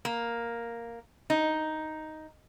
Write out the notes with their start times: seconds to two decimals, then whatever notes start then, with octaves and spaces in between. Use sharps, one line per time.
0.05 A#3
1.30 D#4